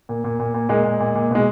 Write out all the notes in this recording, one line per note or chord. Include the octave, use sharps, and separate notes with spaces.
A#2
A#2
A#2
A#2
A#2 G#3
A#2
A#2
A#2
B2 G#3